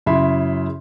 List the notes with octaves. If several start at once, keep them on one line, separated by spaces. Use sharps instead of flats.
F#2 C#3 E4 E5 B5 C6